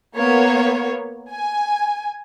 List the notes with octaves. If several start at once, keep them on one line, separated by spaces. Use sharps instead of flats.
A#3 B3 C#5
G#5